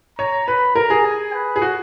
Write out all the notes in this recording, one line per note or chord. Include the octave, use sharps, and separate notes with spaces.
C#5 A#5
B4 B5
A#4 A#5
G#4
G#5
B4
G#4
F#4